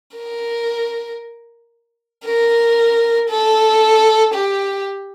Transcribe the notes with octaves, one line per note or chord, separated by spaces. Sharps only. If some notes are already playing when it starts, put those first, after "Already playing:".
A#4
A#4
A4
G4